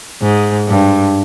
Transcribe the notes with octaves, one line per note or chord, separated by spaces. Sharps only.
G#2
G2